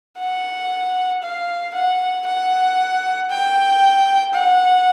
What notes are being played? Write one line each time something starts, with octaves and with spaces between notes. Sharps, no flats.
F#5
F5
F#5
F#5
G5
F#5